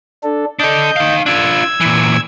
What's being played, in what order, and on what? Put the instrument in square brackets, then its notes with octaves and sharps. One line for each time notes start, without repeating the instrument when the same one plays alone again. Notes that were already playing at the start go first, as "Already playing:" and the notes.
[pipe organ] D4 A4
[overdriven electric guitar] D4 A4 [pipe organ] D#5 G6
[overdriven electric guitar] D#4 F5
[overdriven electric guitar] D4 F4 [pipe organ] E6 G#6
[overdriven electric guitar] A#2 E3